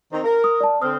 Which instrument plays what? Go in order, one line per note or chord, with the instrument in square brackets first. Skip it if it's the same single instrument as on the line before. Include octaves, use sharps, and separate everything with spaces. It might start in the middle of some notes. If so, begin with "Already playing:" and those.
[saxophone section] D#3 C4
A#4
[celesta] D#6
D5 A5
[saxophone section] D3 C4 [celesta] D#6 F6